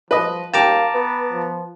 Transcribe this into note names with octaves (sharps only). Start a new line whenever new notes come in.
F3 B4 D#5
D#2 F5 G5 A5 A#5 D6
B3 B4
F3